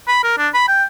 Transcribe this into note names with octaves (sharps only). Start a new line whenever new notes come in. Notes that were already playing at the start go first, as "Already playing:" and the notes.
B5
A#4
D4
B5
G5